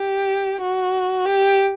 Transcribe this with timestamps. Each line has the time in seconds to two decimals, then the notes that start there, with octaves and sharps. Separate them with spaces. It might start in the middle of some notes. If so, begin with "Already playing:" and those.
Already playing: G4
0.62 F#4
1.26 G4